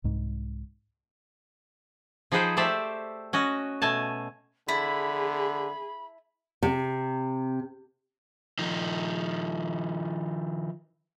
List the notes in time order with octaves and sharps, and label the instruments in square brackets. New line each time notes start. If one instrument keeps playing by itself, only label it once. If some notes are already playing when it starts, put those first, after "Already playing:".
[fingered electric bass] C2 G#2
[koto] F3 D#4 G#4 B4 C5 G5
A3 G4 A4 C5 D5 E5
C#4 F#4 D#5
B2 A3 G#5 A5
[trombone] D3 [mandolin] E4 A5 [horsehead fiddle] G#4 [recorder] B5
[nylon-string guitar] C3
[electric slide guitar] D#3 F3 D#4